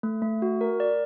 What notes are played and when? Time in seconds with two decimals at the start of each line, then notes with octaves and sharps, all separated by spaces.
0.03 A3
0.22 A3
0.42 F#4
0.61 A#4
0.80 D5